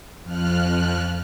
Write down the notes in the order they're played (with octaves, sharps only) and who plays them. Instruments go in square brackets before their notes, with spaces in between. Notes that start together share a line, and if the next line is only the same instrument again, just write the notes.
[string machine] F2 F3 F6 F#6